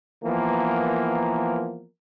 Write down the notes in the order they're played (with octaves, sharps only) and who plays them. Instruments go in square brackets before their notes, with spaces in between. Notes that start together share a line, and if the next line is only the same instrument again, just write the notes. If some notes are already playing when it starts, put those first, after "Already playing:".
[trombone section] E3 F3 A#3 B3 A#4